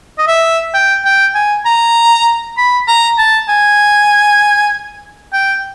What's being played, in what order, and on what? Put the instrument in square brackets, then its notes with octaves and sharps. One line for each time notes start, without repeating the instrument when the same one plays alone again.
[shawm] D#5
E5
G5
G5
G#5
A#5
B5
A#5
A5
G#5
G5